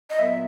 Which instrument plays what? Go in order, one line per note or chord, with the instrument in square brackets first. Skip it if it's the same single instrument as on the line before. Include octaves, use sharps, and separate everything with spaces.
[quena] D#5
[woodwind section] A#2 F#3 B3 [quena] E5